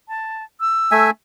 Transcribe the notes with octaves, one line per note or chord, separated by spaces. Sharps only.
A5
E6
A3 E5 G#5